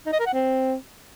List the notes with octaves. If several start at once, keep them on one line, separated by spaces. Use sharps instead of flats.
D#4
D#5
A#4
F#5
C4